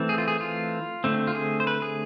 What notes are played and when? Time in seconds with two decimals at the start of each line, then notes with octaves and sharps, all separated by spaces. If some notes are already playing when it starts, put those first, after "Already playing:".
Already playing: E3 A3 C4
0.09 G#4
0.18 F4
0.28 G#4
0.41 F4
1.04 D3 A3 C4
1.27 F4
1.35 G#4
1.60 C5
1.67 B4
1.82 G#4